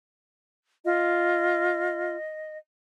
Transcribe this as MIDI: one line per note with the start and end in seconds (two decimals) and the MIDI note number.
0.85 2.16 65
0.85 2.58 75